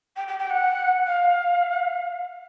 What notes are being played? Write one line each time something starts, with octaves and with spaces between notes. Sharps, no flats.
G5
G5
G5
F#5
F5